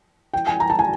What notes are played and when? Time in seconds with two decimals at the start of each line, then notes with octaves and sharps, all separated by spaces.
0.34 G5
0.47 G#5
0.60 A#5
0.70 A5
0.79 G#5